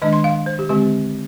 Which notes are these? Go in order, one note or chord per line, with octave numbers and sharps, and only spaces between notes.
D#3 G#3 D4 D#5
C6
F5
C5
G4
D3 G#3 C4 G4